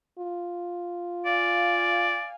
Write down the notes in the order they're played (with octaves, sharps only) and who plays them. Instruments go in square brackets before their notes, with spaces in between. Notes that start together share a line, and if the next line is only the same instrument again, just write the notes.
[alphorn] F4
[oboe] D5 [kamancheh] F5 G#5